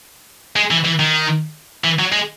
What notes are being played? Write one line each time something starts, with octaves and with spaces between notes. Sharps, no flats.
G#3
E3
E3
D#3
E3
F#3
G#3